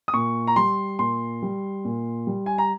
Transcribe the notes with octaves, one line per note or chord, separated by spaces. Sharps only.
D#6
A#2 C#6
A#5
G3 C6
A#2 C6
G3
A#2
G3
G#5
A#5